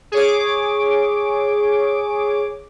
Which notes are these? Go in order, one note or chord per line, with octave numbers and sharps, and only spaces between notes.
G#4 C#5 D6